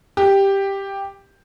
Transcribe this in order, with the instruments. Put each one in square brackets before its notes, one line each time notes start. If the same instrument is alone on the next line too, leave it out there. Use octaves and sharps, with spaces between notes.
[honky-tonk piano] G4